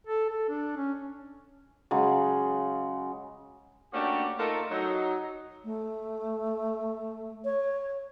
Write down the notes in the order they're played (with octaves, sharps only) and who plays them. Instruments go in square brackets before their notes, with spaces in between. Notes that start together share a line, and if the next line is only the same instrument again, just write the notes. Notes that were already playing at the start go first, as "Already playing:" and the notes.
[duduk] A4
A4
D4
C#4
[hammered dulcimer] C#3 F#3 G#3
[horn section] A3 A#3 C#4 D4 F#4 G4
A3 D#4 F4 A4 A#4
F#3 D#4
[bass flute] A3
C#5